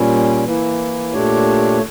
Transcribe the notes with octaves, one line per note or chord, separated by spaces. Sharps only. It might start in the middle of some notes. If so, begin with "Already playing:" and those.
Already playing: A#2 G3 C#4
E3 A#3 E4
A#2 A3 D4 G4 C#5